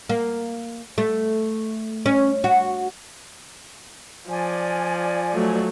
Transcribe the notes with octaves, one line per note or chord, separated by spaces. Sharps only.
A#3
A3
C#4
F#4
F3 D5 G#5
F#3 A3